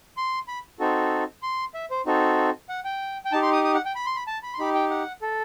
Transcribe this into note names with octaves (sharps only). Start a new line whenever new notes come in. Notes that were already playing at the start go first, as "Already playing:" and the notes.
C6
B5
C4 D#4 F#4 A4
C6
E5
C5
C4 D#4 F#4 A4
F#5
G5
G5
D#4 G4 A5
C6
D#6
D#6
F#5
G5
B5
C6
B5
A5
B5
C6
D#4 G4 B5
G5
F#5
A4